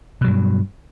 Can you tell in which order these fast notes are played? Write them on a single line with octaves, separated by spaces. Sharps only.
B2 F#3 G2